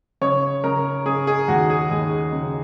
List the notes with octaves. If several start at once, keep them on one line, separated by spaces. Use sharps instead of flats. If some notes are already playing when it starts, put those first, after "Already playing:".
C#3 C#5
C#3 A#4
C#3 G#4
G#4
D#2 F#4
G#4
D#2 G#4
C#3